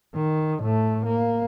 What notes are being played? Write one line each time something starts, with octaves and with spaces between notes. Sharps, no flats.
D#3
A2 A3
A#3